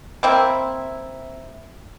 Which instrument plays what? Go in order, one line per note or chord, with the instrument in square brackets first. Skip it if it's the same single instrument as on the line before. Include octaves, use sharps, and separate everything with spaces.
[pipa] A#3 C4 E4